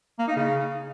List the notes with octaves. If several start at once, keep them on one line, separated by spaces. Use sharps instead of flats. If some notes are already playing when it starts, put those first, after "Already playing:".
A#3
D#4
C#3